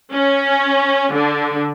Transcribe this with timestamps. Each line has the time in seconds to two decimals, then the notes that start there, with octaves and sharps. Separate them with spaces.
0.12 C#4
1.13 D3